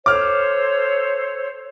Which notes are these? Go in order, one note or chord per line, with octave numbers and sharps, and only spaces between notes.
A4 C5 C#5 D6 F6